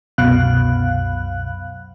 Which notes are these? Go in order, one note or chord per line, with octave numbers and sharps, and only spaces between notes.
C2 F#2 B2 F5 F#6